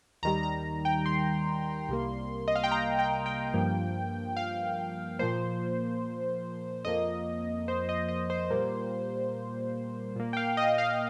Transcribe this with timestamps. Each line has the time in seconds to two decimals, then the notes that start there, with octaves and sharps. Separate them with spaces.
0.23 D#2 D#3 G3 A#5
0.43 A#5
0.85 G5
1.06 C6
1.89 C2 C3 G3 A#3
2.48 D#5
2.55 F5
2.63 G5
2.71 A#5
2.99 G5
3.26 G5
3.54 G2 F3 A#3
4.36 F5
5.19 A#2 F3 A#3 C5
6.85 F2 F3 A#3 D#5
7.68 C5
7.89 D#5
8.08 D#5
8.30 C5
8.50 A#2 G3 A#3
10.16 A#2 A#3
10.33 G5
10.37 F5
10.57 D#5
10.78 F5